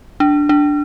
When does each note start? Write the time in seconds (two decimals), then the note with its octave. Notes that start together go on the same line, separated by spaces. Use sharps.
0.20 D4
0.49 D4